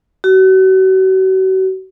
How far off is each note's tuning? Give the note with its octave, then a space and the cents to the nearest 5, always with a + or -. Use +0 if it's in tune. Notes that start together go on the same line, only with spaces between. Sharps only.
F#4 +40